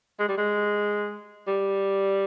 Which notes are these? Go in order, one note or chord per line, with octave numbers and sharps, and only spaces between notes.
G#3
G3
G#3
G3